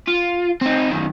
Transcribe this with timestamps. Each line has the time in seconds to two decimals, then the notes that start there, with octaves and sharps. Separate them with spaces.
0.08 F4
0.61 C4 D#4
0.90 F#2 D#3